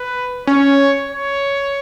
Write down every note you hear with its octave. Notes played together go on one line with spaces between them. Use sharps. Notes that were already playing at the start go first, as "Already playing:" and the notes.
Already playing: B4
C#4 C#5
C#5